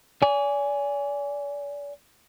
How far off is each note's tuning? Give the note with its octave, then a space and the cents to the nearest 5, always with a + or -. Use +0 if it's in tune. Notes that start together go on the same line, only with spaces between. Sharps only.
D5 -40 G#5 +0